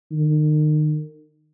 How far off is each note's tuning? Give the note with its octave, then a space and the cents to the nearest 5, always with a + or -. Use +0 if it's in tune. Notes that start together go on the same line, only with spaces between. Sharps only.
D#3 -35